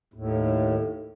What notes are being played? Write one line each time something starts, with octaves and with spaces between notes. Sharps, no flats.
D#2 A2